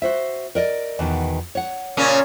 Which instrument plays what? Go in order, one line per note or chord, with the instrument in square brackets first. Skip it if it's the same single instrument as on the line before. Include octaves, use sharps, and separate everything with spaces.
[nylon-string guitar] F#4 C5 E5
A#4 D5 D#5
E2 B2 D#3
C#5 F#5
[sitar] A#2 C#3 C#4